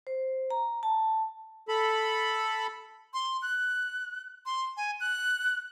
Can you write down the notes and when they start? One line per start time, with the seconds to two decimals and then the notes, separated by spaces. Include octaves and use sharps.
0.07 C5
0.51 A#5
0.83 A5
1.68 A4 B5
3.14 C6
3.42 F#6
4.46 C6
4.77 G#5
5.00 F#6